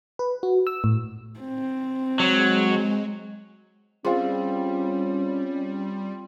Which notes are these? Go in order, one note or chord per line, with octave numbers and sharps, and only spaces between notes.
B4
F#4
E6
A2
C4
F#3 G#3
G3 C4 C#4 F4 G#4 C5 F5